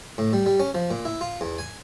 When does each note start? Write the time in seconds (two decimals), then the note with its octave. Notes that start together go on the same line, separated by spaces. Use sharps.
0.18 A2
0.33 G3
0.46 G3
0.60 C#4
0.75 F3
0.91 A#2
1.05 E4
1.21 F4
1.41 E2
1.58 G#5